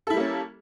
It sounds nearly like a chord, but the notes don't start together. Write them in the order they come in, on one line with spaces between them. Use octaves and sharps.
A4 E4 G3 A#3 C#4